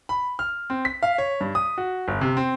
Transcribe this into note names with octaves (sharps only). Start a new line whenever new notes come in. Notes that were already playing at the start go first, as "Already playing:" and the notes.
B5
F6
C4
B6
F5
C#5
G2
D#6
F#4
G1
C3
C4